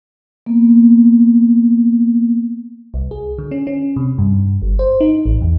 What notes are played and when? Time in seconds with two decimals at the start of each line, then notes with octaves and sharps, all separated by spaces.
0.46 A#3 B3
2.94 C2
3.11 G#4
3.38 D3
3.51 C#4
3.67 C#4
3.96 C3
4.18 G2
4.62 G1
4.79 C5
5.01 D#4
5.26 A1
5.41 E2